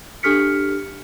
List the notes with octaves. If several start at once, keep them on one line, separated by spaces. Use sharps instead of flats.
D4 G4 A4 F6 B6 C#7